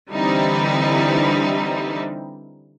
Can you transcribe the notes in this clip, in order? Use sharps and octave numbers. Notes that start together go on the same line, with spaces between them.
D3 E3 G3 C4 D#4 E4